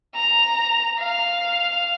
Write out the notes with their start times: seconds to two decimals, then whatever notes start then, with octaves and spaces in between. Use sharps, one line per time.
0.15 A#5
0.99 F5